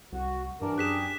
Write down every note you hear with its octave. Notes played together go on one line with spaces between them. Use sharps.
C2 F#4
G2 E3 D4 A#4
F#2 G4 G#4 F#6 B6 E7